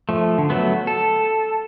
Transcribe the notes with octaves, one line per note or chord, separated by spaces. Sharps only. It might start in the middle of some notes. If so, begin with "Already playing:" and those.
F3 A3
D3
F#3 A3 B3
A4